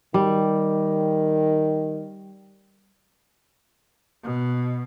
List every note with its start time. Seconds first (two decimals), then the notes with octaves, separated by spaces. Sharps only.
0.14 D#3 G3
4.23 B2